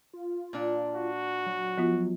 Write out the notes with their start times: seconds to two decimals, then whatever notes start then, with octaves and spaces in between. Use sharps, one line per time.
0.13 F4
0.53 A#2 D4
0.95 F#4
1.46 F#3
1.78 F3 B3 F4